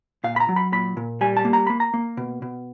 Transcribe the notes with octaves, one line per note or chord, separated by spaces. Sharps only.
A#2 F5
B5
A#5
F#3
B5
A#2 B5
A#2
G3 G#5
A5
A#3
A#5
A#3 B5
A#5
A#3
B2
B2